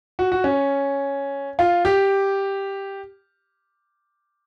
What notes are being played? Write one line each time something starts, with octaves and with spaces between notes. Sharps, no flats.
F#4
F#4
C#4
F4
G4